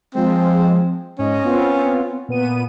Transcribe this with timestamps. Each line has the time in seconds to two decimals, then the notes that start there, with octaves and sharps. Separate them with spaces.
0.15 F3 G#3 C4
1.19 G#2 C#4 D#5
1.44 B3 C4 F4
2.28 A#2 B3 D#7